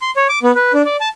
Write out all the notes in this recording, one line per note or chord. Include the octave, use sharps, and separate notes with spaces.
C6
C#5
D6
B3
B4
D4
D5
A5